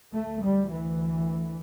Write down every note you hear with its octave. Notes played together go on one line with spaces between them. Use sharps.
D2 A3
G3
E3